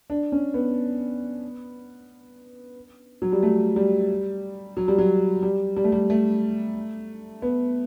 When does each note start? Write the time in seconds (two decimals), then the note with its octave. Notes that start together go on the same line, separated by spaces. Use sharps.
0.10 D4
0.32 C#4
0.54 B3
3.22 F#3
3.32 G3
3.43 A3
3.76 G3
4.77 F#3
4.88 G3
4.98 F#3
5.42 G3
5.76 G3
5.84 A3
5.92 G3
6.10 A3
7.42 B3